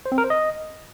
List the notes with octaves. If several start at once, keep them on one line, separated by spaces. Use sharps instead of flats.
C5
C4
A#4
C5
D#5